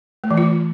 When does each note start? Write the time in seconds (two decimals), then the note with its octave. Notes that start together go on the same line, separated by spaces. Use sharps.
0.24 A3
0.31 E3
0.37 F4